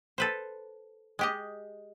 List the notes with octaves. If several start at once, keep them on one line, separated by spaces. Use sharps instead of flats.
A4 B4 C5
G#3 G4 D#5